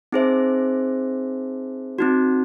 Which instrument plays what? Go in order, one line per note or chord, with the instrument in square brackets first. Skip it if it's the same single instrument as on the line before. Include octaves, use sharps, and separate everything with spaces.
[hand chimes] C4 D#4 G#4 C5 E5
C4 D#4 F#4